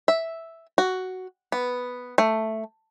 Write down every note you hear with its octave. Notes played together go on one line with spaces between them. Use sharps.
E5
F#4
B3
A3